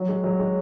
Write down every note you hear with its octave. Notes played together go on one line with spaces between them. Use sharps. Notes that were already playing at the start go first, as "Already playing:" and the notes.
Already playing: F#3
G#3
F#3
G#3